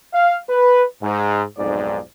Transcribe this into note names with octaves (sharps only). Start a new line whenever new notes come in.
F5
B4
G#2
B1 F2 G#2 D5